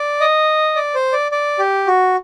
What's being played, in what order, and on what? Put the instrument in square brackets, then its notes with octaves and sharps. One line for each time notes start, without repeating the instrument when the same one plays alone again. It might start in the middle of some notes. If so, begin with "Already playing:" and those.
Already playing: [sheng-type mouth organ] D5
D#5
D5
C5
D5
D5
G4
F#4